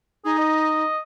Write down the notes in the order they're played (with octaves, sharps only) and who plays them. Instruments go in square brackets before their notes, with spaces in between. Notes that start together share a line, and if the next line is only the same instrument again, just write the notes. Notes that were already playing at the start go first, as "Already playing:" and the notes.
[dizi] D#4 [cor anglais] G#4
[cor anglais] D#5